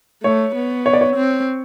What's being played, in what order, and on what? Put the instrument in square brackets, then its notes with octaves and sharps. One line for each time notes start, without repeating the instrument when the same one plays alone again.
[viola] A3 [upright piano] C#5
[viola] B3
[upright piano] C#5
D5
C#5
[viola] C4